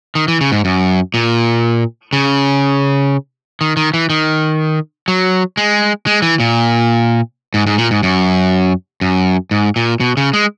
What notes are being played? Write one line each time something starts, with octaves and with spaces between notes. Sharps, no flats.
D#3
E3
C#3
G#2
F#2
A#2
C#3
D#3
D#3
E3
D#3
F#3
G#3
G#3
E3
A#2
G#2
G#2
A#2
G#2
F#2
F#2
G#2
A#2
B2
C#3
G#3